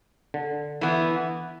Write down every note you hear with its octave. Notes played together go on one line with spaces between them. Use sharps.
D3
E3 B3 E4